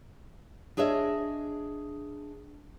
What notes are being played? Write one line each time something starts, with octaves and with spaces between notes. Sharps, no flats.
D4 G#4 C#5 D#5 E5